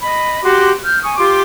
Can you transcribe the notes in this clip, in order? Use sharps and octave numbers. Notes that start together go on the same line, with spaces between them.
D#5 B5
F#4 G4 C6 D6
F6 G6
G#5 C#6 D#6
F4 G4 C6 D6